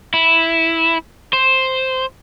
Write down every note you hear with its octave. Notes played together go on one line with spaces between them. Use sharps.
E4
C5